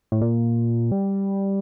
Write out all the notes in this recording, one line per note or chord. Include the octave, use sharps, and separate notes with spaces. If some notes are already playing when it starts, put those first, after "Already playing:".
A2
A#2
G3